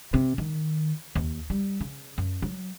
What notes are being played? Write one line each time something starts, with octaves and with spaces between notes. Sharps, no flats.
C3
D#3
D#2
G3
C#3
F#2
F#3